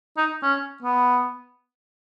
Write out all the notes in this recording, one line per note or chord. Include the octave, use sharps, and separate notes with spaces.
D#4
C#4
B3